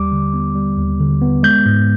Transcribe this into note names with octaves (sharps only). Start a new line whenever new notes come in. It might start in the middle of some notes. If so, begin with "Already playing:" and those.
Already playing: D#2 G3 D6
D3
B3
G3
D#2
D3
B3
G#3 G6
G#2